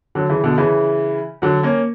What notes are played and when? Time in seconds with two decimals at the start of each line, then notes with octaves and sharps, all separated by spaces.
0.15 D3 F#3
0.29 C#3 E3
0.43 B2 D3
0.58 C#3 E3
1.42 D3 F#3
1.63 A#3 C#4